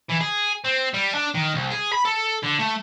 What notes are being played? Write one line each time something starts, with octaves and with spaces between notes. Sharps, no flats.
E3
G#4
C4
G3
D4
D#3
C2
G#4
B5
A4
D3
A3